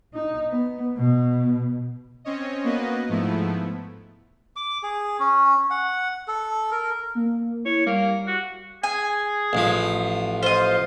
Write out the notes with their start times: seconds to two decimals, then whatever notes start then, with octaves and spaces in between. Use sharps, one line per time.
0.14 D#4
0.50 B3
0.97 B2
2.25 C4 C#4 C#5 D#5
2.64 A#3 B3 F#4 B4 D#5
3.09 G#2 F3 A3 B3 E4
4.56 D6
4.83 G#4
5.20 C#4
5.71 F#5
6.28 A4
6.72 A#4
7.15 A#3
7.65 E4 C#5
7.86 G3 A#3
8.27 F#4
8.83 G#4 G#5
9.53 A1 F3
10.43 F4 C5 D#5